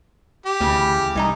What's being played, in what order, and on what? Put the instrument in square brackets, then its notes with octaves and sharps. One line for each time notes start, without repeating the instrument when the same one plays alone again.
[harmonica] G4
[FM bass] D2 [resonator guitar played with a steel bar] C#3 E3
[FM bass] C2 [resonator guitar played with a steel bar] E3 D#4 A#5